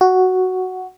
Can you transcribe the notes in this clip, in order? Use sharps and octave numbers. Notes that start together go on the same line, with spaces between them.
F#4